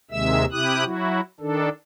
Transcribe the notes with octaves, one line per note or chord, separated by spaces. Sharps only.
D#2 C3 D#3 G#3 E5 E6
C3 E4 G4 D#6 F#6
F#3 E4 F#4
D#3 D4 A4